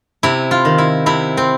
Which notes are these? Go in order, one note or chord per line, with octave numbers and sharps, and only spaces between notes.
C3 E4
F4
D#3
E4
C3 E4
C4